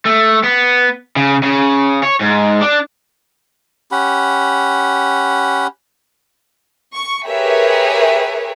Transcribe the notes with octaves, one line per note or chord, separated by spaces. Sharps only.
A3
B3
C#3
C#3
C#5
G#2
D4
C#4 G4 F#5 B5
C#6
G4 G#4 A#4 B4 C#5 E5